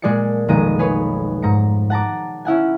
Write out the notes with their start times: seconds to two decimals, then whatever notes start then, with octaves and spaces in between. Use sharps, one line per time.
0.02 A#2 G#3 G#4 D5 A5 C#7
0.48 F1 B1 D#3 G#3 A#5 D#7
0.79 G#4 B4 C#5
1.43 G#2 A#5 C#7
1.90 F#5 A5 A#5 D6
2.45 C#4 E4 F#5 G#5